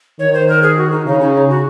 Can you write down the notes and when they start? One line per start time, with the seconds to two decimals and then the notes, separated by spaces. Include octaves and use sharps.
0.19 D#3 C#5
0.34 C5
0.48 A#4
0.63 G#4
0.77 F#4
0.91 D#4
1.06 C#3 D#4
1.20 D#4
1.35 D#4
1.49 F#4